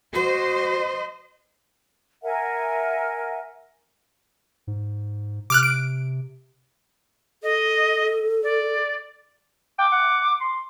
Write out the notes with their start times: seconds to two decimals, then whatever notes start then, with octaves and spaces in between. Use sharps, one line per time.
0.15 F#4 C5 D#5
2.23 A#4 E5 F#5 G#5
4.67 G#2
5.50 C3 D6 F6 F#6
5.63 D7
7.43 A4 D#5
8.43 D5
9.79 G5 D6
9.92 F#5
10.41 C6